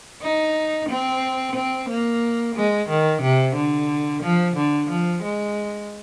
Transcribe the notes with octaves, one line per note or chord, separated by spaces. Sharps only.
D#4
C4
C4
A#3
G#3
D#3
C3
D3
F3
D3
F3
G#3